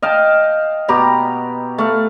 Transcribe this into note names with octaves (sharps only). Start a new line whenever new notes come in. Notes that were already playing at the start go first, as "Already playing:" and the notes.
D#5 F5 G5 A5
B2 G4 A#5 B5
A3 F5